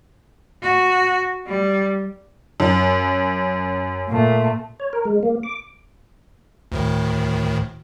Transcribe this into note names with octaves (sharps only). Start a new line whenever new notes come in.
F#4
G3
F#2
A#2 A3
C#5
A#4
G#3
A#3
D6
D2 A2 D#3